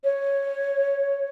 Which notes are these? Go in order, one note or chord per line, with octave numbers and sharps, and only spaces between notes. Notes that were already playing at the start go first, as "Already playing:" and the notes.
C#5